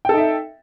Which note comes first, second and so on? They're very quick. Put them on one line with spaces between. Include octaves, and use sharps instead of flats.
G5 A4 D#4 E5